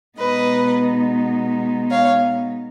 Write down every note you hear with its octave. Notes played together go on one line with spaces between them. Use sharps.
B2 G#3 B3 D#4 B4 D#5
C#5 F5